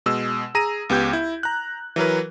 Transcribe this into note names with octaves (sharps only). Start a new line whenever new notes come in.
B2 G#3 E6
G#4 A#5 A#6 D#7
C#2 B3 G4 G6 G#6
E4
A#5 F#6
E3 F#3 A#4 B4